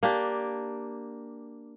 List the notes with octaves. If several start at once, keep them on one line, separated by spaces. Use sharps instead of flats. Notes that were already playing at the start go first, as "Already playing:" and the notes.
A#3 D4 G4